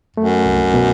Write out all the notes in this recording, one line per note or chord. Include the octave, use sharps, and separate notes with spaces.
F#2 A3
C2
B2